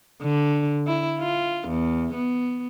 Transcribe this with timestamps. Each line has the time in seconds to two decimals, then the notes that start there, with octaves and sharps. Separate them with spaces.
0.23 D3
0.87 E4
1.20 F4
1.69 E2
2.15 B3